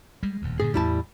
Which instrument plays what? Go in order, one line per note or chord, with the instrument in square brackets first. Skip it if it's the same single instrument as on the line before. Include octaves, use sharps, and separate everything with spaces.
[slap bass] G3 G#3
D#1 D2
[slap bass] G2 A#2 D3 [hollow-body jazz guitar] G#4
[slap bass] E2 A2 [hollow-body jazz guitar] G3 E4 A5